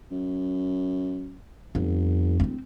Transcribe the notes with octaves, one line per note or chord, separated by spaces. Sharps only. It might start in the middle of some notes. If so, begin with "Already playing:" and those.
F#2
G1 F2
D1 B3 C4